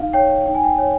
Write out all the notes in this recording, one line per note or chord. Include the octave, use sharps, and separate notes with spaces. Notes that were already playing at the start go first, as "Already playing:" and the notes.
Already playing: D#4 F5
C#5 G5
D#4 G5
G#5
G5
C#5